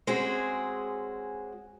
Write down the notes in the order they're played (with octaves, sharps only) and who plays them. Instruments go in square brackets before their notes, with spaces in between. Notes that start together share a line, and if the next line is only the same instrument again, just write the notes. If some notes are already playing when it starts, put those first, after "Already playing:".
[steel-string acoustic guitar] G#3 C4 C#4 F#4 G#4